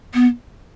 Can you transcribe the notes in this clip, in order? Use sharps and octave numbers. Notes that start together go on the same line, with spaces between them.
B3